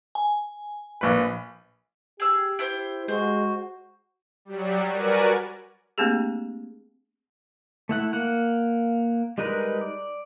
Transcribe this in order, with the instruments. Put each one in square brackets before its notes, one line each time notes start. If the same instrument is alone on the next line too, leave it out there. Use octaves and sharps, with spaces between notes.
[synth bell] G#5
[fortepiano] A#1 B4
[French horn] G4 [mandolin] G#4 E6
[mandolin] E4 C5
[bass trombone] G#3 [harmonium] F#4 [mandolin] C5
[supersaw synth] F#3 G3
F#4 A#4 B4 D5 G#5
[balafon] A3 A#3 C4 D4 G4 G#4
[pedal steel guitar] A3 E4 F#5
A#3 F#5
G3 G#3 D#4 A#4 B4
D5